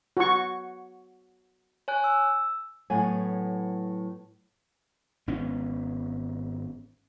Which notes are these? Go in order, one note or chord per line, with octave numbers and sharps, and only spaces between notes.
F#4 C#6
C#5 G#5 F#6
E6
A2 F#3 B3 G#5
G#1 B3 C#4